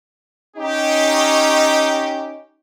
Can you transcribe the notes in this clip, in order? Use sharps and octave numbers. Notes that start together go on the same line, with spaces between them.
C#4 D#4 G4